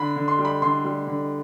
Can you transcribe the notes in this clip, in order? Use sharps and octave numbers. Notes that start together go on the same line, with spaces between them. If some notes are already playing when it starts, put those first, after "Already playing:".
Already playing: D3 B5
D3
C6
G3
B5
D3 C6
G3
D3